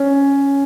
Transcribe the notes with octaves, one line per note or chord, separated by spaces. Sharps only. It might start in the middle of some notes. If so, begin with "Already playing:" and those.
Already playing: C#4